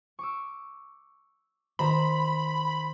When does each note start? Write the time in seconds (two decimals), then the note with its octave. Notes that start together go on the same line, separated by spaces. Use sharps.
0.19 C#6 D6 E6
1.79 D#3 C5 A#5 B5